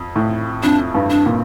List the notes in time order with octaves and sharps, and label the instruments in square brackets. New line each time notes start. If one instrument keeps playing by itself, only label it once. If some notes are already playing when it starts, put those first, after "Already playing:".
Already playing: [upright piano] F2
A2
[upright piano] F2 [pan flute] D4
[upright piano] G2
[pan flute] D4
[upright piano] A#2